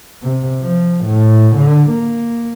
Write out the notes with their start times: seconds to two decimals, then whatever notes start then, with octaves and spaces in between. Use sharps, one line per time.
0.23 C3
0.62 F3
1.05 A2
1.56 D3
1.90 A#3